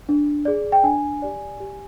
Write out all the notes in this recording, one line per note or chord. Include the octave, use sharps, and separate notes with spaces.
D4
G#4 D5
G5
D4 G#5
G4 D5
G4